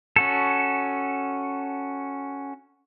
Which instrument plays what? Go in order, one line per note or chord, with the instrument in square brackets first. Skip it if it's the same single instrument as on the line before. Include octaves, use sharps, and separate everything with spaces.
[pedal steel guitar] C#4 F#4 A4